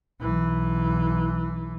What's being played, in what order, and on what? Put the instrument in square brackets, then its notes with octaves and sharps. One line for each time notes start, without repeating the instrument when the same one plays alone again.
[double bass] B1 E3